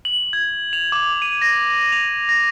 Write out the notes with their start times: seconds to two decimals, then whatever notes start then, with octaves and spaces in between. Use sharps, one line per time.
0.05 F#7
0.33 G#6
0.73 F7
0.92 D6
1.22 D#7
1.42 A#6
1.92 F7
2.29 A#6